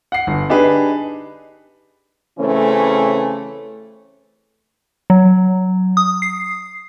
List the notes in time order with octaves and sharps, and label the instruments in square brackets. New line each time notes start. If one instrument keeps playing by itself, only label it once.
[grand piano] F#5 C7
G1
D4 D#4 G4 G#4 B4
[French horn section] C#3 E3 A3 C4 C#4
[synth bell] F#3
D#6
C7